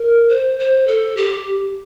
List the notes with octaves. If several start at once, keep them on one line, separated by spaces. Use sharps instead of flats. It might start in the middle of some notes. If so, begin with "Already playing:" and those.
Already playing: A#4
C5
C5
A4
G4